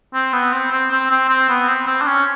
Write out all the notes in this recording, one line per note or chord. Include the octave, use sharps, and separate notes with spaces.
C4
B3
C4
C4
C4
C4
C4
B3
C4
C4
D4
C#4